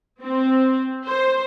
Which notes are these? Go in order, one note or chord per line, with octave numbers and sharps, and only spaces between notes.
C4
C5